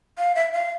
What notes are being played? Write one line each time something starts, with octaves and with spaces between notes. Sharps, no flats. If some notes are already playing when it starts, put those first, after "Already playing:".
F5
E5
F5